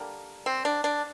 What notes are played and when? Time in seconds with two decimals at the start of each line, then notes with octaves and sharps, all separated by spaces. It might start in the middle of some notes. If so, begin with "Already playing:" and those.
Already playing: D3 G3 A#3
0.46 C4
0.65 D4
0.84 D4